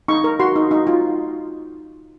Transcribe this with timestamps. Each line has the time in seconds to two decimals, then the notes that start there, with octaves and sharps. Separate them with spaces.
0.08 D#4 C#6
0.24 A#4
0.40 F#4 C6
0.56 D#4
0.71 D#4
0.87 F4